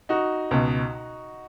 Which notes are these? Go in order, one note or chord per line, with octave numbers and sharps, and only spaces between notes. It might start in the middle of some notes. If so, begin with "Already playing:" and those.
D#4 F#4
C#2 B2